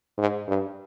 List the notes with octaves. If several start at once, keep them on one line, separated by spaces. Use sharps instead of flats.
G#2
G2